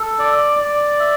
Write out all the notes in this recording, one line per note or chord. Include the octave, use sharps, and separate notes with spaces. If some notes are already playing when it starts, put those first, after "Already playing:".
Already playing: A4
D5
D5
E5